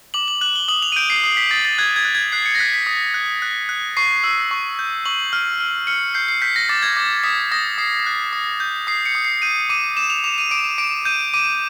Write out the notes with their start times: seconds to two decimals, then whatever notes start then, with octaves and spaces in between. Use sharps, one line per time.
0.14 D6 F#7
0.28 F#7
0.41 F#6 F#7
0.56 G7
0.68 D#6 F#7
0.82 F7
0.92 D#7
0.96 G6 D7
1.10 C7
1.24 D#6 C7
1.37 B6
1.51 D#6 A6
1.65 A6
1.78 F#6 G#6
1.96 G#6
2.05 F#6
2.15 G#6
2.32 F#6 C7
2.46 C#7
2.55 A#6
2.59 F#6 B6
2.74 B6
2.87 D#6
3.14 F#6
3.42 F#6
3.69 F#6
3.97 C#6 C7
4.24 E6
4.51 C#6
4.79 G6
5.05 C#6 F#7
5.33 F6
5.60 F6
5.87 F6 C#7
6.14 G6 C7
6.28 C7
6.42 G6 B6
6.56 A#6
6.69 D6 A6
6.82 G#6
6.97 D6 A#6
7.23 D#6 B6
7.52 D#6 A#6
7.78 D#6 C7
8.06 F#6
8.33 D#6
8.60 G6
8.87 D#6 C7
9.06 C#7
9.15 D#6
9.25 C7
9.42 G6 D#7
9.70 D6 D#7
9.97 D6 E7
10.10 F7
10.24 D6 F7
10.38 D#7
10.51 D6 D7
10.78 D6 D7
11.05 G6 D#7
11.33 D6 D#7